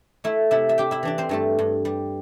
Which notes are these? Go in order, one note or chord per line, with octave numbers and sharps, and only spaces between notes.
A3 E4 E5
C3 E4 E5
E5
D4 G4 G5
E4 E5
E3 D4 D5
C4 C5
G2 A3 A4
G2
G3